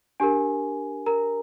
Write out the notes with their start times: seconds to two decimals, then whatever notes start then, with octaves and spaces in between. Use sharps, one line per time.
0.20 D4 G4 A#4 G#5
1.06 A#4 A#5